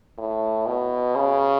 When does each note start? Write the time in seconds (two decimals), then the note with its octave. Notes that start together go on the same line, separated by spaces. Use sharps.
0.18 A2
0.67 B2
1.16 C#3